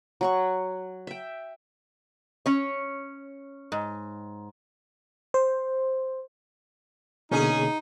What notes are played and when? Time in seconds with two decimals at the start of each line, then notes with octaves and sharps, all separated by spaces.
0.21 F#3 F#5 C#6
1.07 E5 G5
2.46 C#4 C#5
3.72 G#2
5.34 C5
7.31 B2 D3 A#3 C#4 D#4 G#4